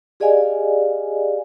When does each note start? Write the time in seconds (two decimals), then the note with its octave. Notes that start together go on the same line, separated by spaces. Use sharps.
0.20 G4 G#4 D5 D#5 F5 G#5